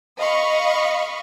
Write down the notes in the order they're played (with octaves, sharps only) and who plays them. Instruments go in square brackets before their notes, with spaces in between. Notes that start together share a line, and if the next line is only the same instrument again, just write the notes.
[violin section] D#5 F5 B5 C#6